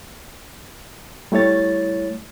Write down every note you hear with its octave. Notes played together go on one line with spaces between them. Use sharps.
G3 A3 E4 C#5 A6